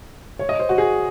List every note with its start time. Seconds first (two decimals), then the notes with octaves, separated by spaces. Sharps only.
0.39 C#5
0.49 D#5
0.59 C5
0.69 F#4
0.78 G#4